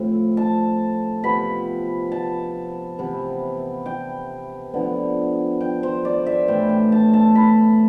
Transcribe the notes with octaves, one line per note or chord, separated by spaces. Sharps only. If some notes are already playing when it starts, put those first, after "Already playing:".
Already playing: A2 F3 C4
A5
C3 F3 B3 B5
A5
C3 E3 B3
G5
D3 F3 B3
G5
C5
D5
E5
A2 E3 A3 G5
G5
A5
A5
B5